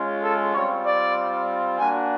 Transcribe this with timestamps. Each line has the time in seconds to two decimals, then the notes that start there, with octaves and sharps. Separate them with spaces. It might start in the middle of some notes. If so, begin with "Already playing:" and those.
Already playing: G#3 C#4 F4
0.23 A4
0.53 G3 C4 F4 C#5
0.85 D5
1.78 A#3 D4 F#4 G#5